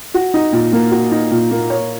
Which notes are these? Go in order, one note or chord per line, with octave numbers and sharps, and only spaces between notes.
F#4
D#4
A#2
A#3
F#4
D#4
A#2
A#3
C#5